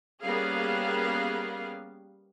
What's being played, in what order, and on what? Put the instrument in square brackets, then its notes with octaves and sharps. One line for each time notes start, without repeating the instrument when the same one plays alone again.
[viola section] G3 A#3 B3 C#4 G#4 F5